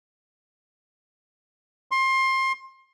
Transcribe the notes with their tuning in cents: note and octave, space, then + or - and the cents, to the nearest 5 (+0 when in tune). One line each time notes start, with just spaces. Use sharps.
C6 +25